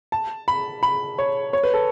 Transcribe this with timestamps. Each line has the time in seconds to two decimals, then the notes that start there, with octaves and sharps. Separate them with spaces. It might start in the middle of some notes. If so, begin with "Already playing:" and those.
0.12 A5
0.48 B5
0.83 B5
1.19 C#5
1.53 C#5
1.64 B4
1.74 A4